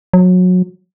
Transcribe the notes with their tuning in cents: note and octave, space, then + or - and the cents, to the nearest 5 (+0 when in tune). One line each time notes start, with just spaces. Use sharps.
F#3 -25